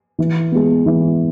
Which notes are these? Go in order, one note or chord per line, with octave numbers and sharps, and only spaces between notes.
E3
G#3 B3
E3